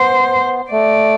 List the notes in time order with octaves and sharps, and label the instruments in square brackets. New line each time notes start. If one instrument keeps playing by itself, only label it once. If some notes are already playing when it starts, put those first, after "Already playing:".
Already playing: [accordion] B3 [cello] C5
[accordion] A3 [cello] D5